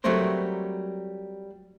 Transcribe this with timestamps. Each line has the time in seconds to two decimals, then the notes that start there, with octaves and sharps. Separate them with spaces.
0.04 F#3 G3 A3 C4 A#4 C5